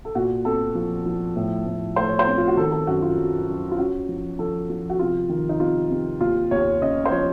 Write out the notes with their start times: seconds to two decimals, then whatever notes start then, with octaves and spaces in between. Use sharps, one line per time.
0.05 A4
0.15 A#2 F#4
0.45 C4 A4
0.75 F3
1.06 F3
1.36 A2
1.66 A2
1.96 A3 C5
2.08 C#5
2.19 C5
2.27 C4
2.37 F4
2.47 F#4
2.57 D#3 A4
2.72 A4
2.87 F#2 F#4
3.02 F4
3.18 F#3
3.48 F#2
3.71 F4
3.78 C#4 F#4
4.09 F3
4.39 F3 A4
4.69 F3
4.90 F#4
4.99 C3 F4
5.29 D#3
5.49 D#4
5.60 C3 F4
5.90 C3
6.20 D#2 F4
6.51 D#2 C#5
6.81 C#3 D#5
7.05 C5
7.11 F3 C#5